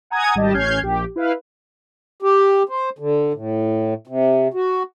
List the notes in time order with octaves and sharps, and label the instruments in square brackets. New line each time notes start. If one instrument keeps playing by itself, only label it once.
[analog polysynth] F#5 G#5 A#5 D#6 G#6
G#1 G3 G4 D#5 A5
A1 C#4 F6 G6 G#6 C7
A#1 G4
E4 B4 F5
[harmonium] G4
C5
D3
A2
C3
F#4